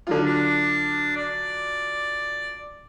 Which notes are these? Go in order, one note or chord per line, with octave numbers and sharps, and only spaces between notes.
D3 F#3 F4
D4
D5